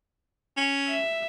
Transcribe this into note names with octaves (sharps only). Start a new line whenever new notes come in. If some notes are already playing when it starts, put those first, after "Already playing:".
C#4
E5